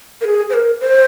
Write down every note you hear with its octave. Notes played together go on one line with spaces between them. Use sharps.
A#4
G#4
C5
A#4
C5